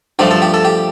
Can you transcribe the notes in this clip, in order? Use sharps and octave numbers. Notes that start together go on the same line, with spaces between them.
G2 F3 A3 G4
A4
G4
A4
G4